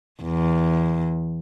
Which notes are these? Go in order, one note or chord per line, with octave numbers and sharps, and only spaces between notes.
E2